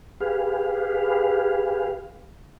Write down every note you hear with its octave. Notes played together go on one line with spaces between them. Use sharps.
G4 G#4 B4 F5